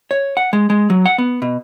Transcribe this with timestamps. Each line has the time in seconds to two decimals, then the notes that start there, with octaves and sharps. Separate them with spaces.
0.11 C#5
0.37 F#5
0.53 G#3
0.70 G#3
0.90 F#3
1.06 F#5
1.18 B3
1.42 B2